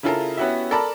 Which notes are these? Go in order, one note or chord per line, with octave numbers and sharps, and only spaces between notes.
C#3 E4 F4 A4 A#4
B3 C#4 E4 F#4 G4 E5
A4 A#4 D5 A5 B5